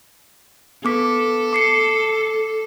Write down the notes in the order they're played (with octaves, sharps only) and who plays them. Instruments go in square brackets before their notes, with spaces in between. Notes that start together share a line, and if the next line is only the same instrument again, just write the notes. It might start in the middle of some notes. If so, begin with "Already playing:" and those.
[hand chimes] B3 D6 B6 [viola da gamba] A4
[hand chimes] D6 C7 C#7